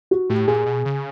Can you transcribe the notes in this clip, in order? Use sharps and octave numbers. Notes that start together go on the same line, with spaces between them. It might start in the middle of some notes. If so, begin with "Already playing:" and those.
F#4
A2 G4
A#2 G#4
B2
C#3